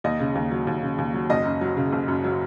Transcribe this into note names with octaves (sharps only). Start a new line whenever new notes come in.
D#2 D#5
C#3
D#2
F#3
D#2
C#3
D#2
F#3
F#1 D#5
F#2
F#3
C#3
F#1
F#2
F#3